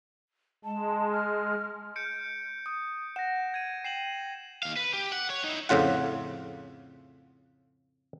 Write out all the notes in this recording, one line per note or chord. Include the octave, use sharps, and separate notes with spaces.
G#3 A5
F6
G6 C#7 D7
D#6
F#5 A#6 E7
G#6 D#7
G5 C7 E7 F#7
D#2 F5
B4
G4
F#5
C#5
D#4 E4
F2 A2 C#3 F4 F#5